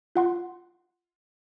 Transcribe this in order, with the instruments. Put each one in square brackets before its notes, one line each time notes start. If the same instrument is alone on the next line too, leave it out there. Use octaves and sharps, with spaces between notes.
[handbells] F4 F#5 C6